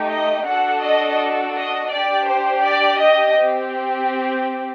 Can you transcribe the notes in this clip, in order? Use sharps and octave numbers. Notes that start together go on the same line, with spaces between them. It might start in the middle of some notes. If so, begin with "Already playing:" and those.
Already playing: A3 D#4 G4
D#5
D4 F#4 A4 F#5
D#5
D#5
D4 G4 D5
C5
D5
D#5
C4 G4